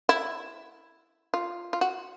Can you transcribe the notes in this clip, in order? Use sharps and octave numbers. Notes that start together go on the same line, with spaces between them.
E4
F4
F4
F#4